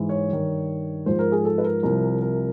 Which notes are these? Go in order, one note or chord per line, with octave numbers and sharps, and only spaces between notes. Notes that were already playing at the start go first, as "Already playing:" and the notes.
Already playing: G#2 E3
C#5
G2 D#3
G#2 F3 C5
A#4
G#4
A4
B4
A#4
C2 C3 F3 A#4
A#4